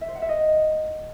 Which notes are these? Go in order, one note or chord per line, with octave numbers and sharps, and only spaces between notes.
E5
C5
F#5
E5
D#5